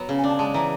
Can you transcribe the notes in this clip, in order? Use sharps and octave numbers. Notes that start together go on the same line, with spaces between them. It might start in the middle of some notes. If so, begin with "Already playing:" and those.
Already playing: F#3 B3
C#3
G#5
D4 A5
G#3 A5
E3 A#5